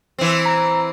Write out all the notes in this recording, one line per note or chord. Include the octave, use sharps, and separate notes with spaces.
E3 C4
A#5